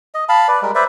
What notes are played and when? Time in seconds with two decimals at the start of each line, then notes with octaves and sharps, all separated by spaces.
0.14 D#5
0.29 F5 A5 B5
0.48 B4 D5
0.62 G3 G#3 A#4
0.75 B4 C5 D5 E5